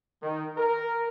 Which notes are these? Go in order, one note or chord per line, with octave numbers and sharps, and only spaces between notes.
D#3
A#4